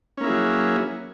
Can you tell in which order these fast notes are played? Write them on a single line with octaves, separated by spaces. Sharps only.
C#4 A#3 E4 G#4 F#3